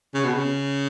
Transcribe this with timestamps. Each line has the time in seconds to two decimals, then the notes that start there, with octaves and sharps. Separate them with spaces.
0.14 C#3
0.24 B2
0.34 C#3